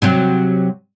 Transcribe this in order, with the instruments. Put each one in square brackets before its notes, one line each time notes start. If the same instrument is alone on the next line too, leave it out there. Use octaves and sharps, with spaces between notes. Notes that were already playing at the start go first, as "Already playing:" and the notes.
[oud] C3 F#3 C4